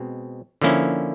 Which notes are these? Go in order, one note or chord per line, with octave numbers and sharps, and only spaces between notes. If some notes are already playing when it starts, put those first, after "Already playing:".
Already playing: B2 G#3 C4
D3 F3 A#3 C#4 E4